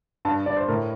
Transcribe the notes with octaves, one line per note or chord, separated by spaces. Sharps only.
G2 A5
G2 D5
C5
A2 A#4